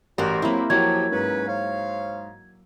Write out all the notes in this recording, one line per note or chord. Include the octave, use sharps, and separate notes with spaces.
A1 G3 F#4 G4 A#4 C5 F#6
F#3 A#3 C4 E4 B5
D#2 F3 F#3 E4 G4 C#5 G#6
G#2 C#4 B4
C5 C#5 F5